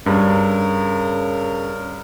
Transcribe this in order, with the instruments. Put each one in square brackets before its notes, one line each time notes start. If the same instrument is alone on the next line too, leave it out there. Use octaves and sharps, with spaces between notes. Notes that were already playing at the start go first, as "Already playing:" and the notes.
[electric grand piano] G2 [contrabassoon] C#3 [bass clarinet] A#4